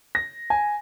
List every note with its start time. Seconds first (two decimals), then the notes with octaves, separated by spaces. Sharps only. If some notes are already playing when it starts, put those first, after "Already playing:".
0.15 A#6
0.50 G#5